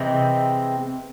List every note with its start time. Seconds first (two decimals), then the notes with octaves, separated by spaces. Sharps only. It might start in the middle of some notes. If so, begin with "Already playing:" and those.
Already playing: C3 E3 G#3 C4